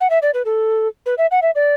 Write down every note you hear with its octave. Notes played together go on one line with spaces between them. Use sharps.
F#5
E5
D5
B4
A4
B4
E5
F#5
E5
D5